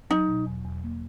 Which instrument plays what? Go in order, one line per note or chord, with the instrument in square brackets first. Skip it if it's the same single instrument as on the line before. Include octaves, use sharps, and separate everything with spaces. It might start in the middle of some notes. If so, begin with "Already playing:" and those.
[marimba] F#3 [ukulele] D#4
[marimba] B2
E2
E2
A#3